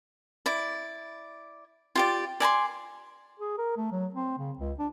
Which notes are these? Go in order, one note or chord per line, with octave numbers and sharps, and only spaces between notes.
E4 D5
F4 G4 D5
D5 G#5 A#5 C6
G#4
A#4
A3
F#3
C4
C#3
C#2
D4